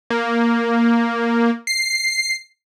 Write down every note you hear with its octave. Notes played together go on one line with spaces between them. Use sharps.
A#3
C7